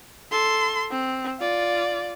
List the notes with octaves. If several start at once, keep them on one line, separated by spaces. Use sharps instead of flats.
A4 C6
C4
F4 D5